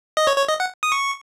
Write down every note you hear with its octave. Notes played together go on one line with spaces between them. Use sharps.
D#5
C#5
C#5
D#5
F#5
D#6
C#6